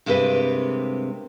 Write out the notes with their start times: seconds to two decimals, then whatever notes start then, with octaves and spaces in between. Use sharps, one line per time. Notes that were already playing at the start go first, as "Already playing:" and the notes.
0.06 G2 C3 G#3 A#3 C4 B4